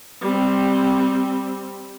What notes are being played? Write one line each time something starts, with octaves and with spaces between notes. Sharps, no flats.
G3 C4